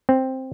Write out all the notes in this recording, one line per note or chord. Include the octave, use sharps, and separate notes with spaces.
C4